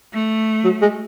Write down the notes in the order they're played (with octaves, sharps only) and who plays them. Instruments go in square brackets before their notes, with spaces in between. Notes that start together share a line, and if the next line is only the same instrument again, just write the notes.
[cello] A3
[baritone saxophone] F#3
G#3